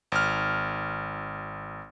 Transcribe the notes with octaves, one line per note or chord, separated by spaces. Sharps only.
G#1 F6